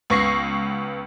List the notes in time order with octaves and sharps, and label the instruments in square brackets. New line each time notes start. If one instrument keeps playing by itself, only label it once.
[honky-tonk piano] C#2 B3 C#6 A#6 C7